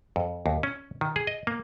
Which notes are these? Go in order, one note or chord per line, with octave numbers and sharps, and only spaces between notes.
F2
D#2
C#4
D#3
G#4
D#5
A#3